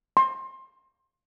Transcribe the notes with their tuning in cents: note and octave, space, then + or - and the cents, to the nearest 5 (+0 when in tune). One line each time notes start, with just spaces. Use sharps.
C6 +25